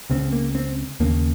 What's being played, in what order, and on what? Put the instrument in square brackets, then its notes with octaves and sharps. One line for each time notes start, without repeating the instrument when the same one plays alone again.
[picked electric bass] C#2 C#3 C4
A#3
C4
D#2 C#3 A#3